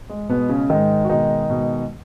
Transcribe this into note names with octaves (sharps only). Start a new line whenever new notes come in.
G#3
B2 G#3 B3
C#3 C#4
G#2 D#3 G#3 D#4
F#4
B2 D#3 G#3 D#4
B2 G#3